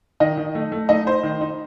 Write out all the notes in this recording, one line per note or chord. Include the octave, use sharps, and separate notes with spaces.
D#3 D#4 D#5
D#3
A3
A3
A3 D#4 D#5
D#4 C5
D#3
D#4